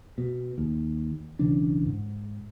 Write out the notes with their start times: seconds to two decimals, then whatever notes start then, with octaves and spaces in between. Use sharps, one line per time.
0.18 B2
0.58 D#2
1.39 B1 C#3 E3 D4
1.87 G#2